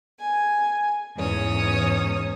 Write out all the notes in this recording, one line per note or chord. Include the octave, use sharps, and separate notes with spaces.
G#5
E2 G#2 E3 C#4 C#5 D#6